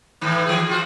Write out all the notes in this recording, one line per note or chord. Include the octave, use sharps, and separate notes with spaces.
A2 D#3 E3
E3 G#4
F4 F#4